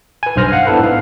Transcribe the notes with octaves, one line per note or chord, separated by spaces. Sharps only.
B4 G#5
B1 G2 C5 F6 A#6
F5 F#5
B3 D4 E4 A4 B4
G#2 F5